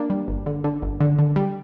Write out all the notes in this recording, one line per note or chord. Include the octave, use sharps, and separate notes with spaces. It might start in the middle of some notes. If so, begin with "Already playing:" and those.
Already playing: A#3 D4
G3
G1
D3
D3
G1
D3
D3
G3